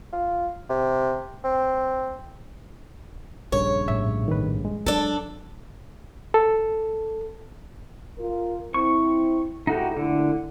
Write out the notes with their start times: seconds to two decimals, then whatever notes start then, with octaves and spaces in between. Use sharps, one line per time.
0.12 F4
0.69 C3
1.44 C4
3.52 A#1 G2 C#3 C#5
3.88 A2 E5
4.28 D#3 B4
4.65 G#3
4.86 F#3 D4 A4
6.34 A4
8.17 F4 A#4
8.74 C4 E4 C#6
9.67 G#2 D#4 E4 F#4 G4 A4
9.97 A#2 D3 A3 E4